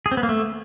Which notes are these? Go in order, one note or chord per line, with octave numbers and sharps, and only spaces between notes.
G#4
C4
B3
A#3
A3